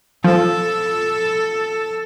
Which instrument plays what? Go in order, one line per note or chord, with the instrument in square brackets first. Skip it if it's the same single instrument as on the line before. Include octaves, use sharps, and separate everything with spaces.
[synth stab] F3 [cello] A4